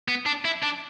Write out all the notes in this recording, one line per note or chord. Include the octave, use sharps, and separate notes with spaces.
B3
D4
E4
D4